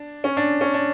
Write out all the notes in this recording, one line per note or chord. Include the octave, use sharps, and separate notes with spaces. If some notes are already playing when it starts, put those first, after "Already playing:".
Already playing: D4
C#4
D4
C#4
D4